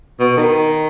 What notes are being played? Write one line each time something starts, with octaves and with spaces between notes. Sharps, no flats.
B2
D#3